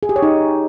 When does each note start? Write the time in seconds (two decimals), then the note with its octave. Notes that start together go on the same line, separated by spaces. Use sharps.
0.03 G#4
0.09 G4
0.16 C#5
0.22 D#4